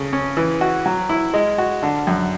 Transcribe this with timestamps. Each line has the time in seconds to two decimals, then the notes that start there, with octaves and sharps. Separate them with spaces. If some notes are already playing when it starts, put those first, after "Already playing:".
Already playing: C#3 A4
0.13 C#4
0.37 E3
0.61 F#4
0.86 F#3
1.09 E4
1.34 G#3
1.58 F#4
1.83 D3
2.07 F#2